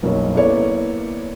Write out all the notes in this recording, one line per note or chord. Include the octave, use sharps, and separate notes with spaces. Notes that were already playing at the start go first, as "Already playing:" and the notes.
F#1 B1 G3 A#4 C#5
A#3 B3 E4 A4 C#5 D5